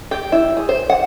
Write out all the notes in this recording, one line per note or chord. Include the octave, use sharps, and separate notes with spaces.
G4
E4
G#4
C5
F#5